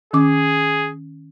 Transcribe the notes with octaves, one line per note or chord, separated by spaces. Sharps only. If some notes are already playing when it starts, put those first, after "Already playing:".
D#3 C#4 G#4 D6